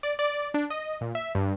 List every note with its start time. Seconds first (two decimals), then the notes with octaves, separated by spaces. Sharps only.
0.03 D5
0.19 D5
0.54 D4
0.70 D#5
1.01 A#2
1.15 E5
1.35 G2